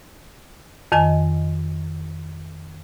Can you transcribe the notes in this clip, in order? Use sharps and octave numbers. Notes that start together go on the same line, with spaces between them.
F2 D#3 D#5 G#5